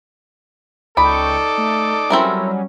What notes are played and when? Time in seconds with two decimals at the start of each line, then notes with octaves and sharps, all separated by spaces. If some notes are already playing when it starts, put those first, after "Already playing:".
0.97 C#2 D#4 A4 D5 G5 B5 C#6 D6
1.58 A3
2.10 F#3 G3 C4 C#4 E4 A#4